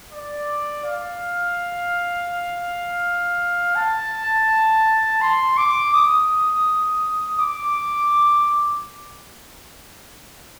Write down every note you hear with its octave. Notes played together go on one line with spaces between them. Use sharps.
D5
F5
A5
C6
D6
D#6
D6